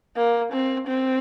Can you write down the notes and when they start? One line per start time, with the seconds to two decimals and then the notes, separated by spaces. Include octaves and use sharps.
0.16 A#3
0.52 C4
0.87 C4